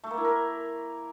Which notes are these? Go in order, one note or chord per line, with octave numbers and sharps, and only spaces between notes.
A3
A#3
E4
A#4